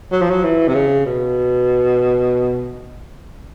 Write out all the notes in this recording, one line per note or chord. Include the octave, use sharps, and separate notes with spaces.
F#3
F3
F#3
E3
C3
C#3
B2